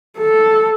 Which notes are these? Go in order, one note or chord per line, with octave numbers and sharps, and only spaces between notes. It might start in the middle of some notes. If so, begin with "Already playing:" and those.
A4